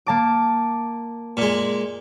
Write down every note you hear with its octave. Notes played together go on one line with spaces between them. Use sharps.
A#3 A5 D6
A#2 G#3